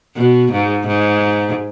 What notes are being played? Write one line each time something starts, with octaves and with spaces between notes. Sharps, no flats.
B2
G#2
G#2